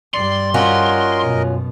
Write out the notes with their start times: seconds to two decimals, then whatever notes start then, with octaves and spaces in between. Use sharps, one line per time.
0.14 G2 G3 D5 C6
0.54 C#4 F4 F#4 A#4 D#5
1.23 F#2 B2